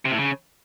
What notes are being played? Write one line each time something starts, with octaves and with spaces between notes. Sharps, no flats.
C3
A2
C#3